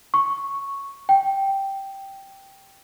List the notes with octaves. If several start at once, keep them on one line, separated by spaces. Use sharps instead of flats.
C#6
G5